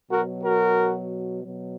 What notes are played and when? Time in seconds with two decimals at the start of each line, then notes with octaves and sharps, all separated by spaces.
0.10 B2 F#3 F#4 A#4
0.44 F#4 A#4
1.44 B2 F#3